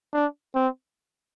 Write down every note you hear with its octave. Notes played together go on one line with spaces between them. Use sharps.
D4
C4